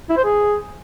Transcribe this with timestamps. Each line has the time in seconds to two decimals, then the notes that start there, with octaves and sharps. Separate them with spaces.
0.10 E4
0.17 C5
0.24 G#4